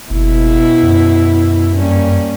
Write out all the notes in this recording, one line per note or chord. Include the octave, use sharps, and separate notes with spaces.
F#1 B2 E4
F#2
G2 A#3 C#4